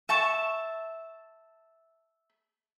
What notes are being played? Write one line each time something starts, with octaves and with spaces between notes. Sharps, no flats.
E5 A5 C#6